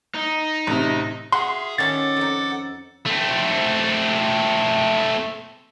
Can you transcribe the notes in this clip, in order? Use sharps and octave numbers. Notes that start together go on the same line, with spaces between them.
D#4
A1 C3
F#4 G#4 E5 F5 C6
D#3 C#4 A4 F#5 A5 D6 A6
F2 D#4
A3 C4